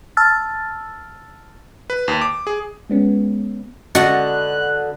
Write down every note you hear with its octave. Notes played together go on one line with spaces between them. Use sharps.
A5 E6 F6 A6
B4
D#2
D6
G#4
G#3 B3 C#4
D3 B3 F#4 D#5 F#5 F#6